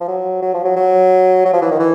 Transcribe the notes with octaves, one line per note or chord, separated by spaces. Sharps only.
F3
F#3
F#3
F3
F#3
F#3
F#3
F3
E3
D#3
E3